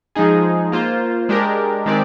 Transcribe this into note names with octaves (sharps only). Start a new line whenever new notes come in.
F3 G#3 D#4 G#4
A#3 F4 C5
G#3 D4 G4 A#4
D#3 G#3 C4 G4 D5